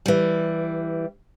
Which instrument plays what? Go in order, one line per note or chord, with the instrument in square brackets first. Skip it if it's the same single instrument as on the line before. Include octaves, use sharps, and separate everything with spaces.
[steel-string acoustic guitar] E3 G3